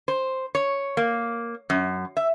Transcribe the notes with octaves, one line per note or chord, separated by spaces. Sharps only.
C5
C#5
A#3
F#2
E5